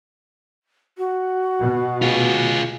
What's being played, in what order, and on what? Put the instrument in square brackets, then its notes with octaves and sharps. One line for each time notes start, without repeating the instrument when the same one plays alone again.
[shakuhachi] F#4
[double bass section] B2
[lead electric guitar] F4 G#4